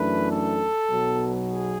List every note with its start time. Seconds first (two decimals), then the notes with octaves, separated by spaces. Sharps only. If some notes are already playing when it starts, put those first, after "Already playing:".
Already playing: F#2 E3 A3 D4 B4
0.32 A4
0.89 B1 B2 F#3
1.48 G#4